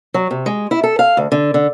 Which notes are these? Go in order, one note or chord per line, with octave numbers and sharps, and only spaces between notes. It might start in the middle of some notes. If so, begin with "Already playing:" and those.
F#3
C3
G#3
E4
A4
F5
D2
D3
D3